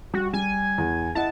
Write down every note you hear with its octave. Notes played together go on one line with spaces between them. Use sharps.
G3 F#4
G3 G#5
E2
E4 D#5 F#5 A5